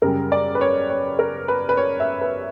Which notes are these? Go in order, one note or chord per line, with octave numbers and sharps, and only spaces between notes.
F#2 C#3 G3 A#4
D5
B4
C#5
C#5
A#4
B4
B4
C#5
E5
B4